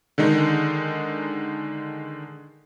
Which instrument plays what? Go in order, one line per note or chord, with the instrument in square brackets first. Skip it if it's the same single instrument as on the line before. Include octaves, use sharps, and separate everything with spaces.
[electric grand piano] D3 D#3 G#3 D#4